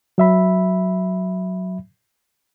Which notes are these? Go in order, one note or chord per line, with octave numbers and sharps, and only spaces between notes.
F#3 E5 B5